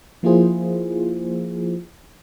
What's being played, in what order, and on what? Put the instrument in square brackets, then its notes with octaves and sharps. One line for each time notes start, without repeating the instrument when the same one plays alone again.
[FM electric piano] F3 A#3 E4 F4 G#4 C5